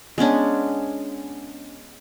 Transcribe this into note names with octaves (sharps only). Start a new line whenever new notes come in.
G#3 B3 C#4 D4